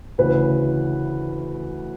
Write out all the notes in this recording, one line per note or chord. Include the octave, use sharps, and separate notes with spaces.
D2 C#3 E3 B4